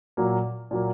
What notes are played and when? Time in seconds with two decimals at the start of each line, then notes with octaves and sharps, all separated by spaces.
0.17 A#2 F#3 A#3
0.71 A#2 F#3 A#3